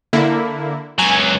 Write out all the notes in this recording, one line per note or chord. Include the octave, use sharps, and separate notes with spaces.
D3 A#3 E4
C#2 F#3 G#5